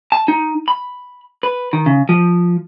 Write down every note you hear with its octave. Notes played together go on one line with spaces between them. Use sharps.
A5
D#4
B5
B4
D#3
C#3
F3